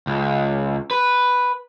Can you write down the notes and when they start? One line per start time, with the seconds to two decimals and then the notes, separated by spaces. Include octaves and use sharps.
0.07 C#2
0.91 B4